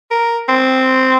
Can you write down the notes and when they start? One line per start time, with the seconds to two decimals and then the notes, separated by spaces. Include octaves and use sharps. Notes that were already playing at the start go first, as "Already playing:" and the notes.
0.11 A#4
0.49 C4